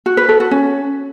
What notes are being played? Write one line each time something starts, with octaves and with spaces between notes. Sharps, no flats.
F#4
B4
A4
F#4
C#4